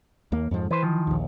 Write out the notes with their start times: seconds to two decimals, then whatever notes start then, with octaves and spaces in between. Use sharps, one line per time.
0.32 D#2 A#3
0.51 F2 G#2 F3
0.71 E3 B4 C5
0.83 D#3 F3
1.07 A#1 D#2